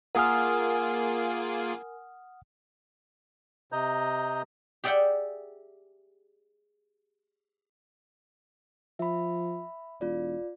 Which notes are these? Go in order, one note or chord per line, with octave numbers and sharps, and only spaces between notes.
A#3 F4 G#4 A#4 F#5 G#5 D#6 F6
C3 D#5 A#5 G6
G4 G#4 D5 E5 F#5 G5
F3 E5 B5
E1 F4 D5